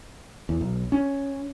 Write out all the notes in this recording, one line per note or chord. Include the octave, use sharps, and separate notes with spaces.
E2
B1
C#4